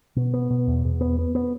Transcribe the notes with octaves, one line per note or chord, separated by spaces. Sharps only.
B2
B3
B2
E2
E2
B3
B3
B3